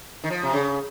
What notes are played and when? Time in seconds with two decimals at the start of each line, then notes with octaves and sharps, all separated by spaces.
0.24 D#3
0.30 F3
0.43 C3
0.53 C#3